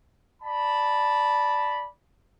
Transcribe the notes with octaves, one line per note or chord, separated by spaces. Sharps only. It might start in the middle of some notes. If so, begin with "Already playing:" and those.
D5 A5 B5